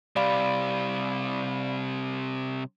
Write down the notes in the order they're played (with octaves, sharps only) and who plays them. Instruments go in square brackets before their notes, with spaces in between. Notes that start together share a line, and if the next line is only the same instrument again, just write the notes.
[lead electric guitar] C3 G3 [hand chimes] D5 F5 B5